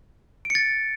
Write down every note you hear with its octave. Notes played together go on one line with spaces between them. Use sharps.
D7
C#7
A6